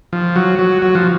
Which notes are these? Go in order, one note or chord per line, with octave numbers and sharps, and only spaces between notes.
F3
F#3
F#3
F#3
F3